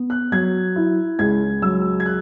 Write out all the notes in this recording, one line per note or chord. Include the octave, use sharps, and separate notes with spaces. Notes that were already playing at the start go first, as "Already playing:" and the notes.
Already playing: B3
F#6
F#3 G#6
E4
C#2 G#6
F#3 E6
G#6
F#6